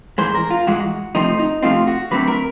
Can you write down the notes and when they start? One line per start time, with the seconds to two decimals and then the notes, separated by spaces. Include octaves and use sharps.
0.18 G#2 E3 G#3 C5
0.35 A#4
0.51 F4
0.67 G#2 E3 G#3 F#4
1.15 C3 F3 A3 C4 D#4
1.39 D#4
1.63 C3 F3 A3 C4 F4
1.87 F#4
2.11 D3 F#3 A3 C4 B4
2.28 A#4